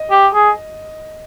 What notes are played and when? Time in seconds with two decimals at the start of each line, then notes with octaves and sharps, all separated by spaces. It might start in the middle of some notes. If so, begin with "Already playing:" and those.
Already playing: D#5
0.10 G4
0.34 G#4